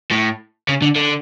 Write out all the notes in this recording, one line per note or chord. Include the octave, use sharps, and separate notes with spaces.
A2
C#3
D3
D3